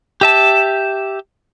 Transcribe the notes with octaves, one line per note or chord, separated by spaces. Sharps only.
G4 E5 A5